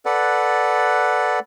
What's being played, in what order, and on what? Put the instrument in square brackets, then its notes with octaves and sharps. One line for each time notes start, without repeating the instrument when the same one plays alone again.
[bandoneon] A4 B4 D5 F#5